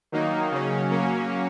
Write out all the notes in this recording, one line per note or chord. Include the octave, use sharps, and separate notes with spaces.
D#3 F#3 A#3 D#4
C#3 F#3 C#4
F#3 A#3 C#4